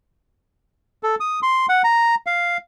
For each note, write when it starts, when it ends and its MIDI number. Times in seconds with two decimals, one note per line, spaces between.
1.03 1.15 69
1.20 1.40 87
1.42 1.66 84
1.69 1.82 78
1.84 2.15 82
2.26 2.57 77